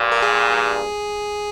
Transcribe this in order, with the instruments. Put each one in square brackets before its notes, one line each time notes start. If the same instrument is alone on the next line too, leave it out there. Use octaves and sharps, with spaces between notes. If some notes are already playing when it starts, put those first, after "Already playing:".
Already playing: [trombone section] G2 A#2
[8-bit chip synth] A#4
G#4